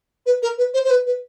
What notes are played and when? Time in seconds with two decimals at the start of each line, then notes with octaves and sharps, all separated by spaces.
0.26 B4
0.42 A#4
0.58 B4
0.74 C5
0.84 C5
0.90 B4
1.06 B4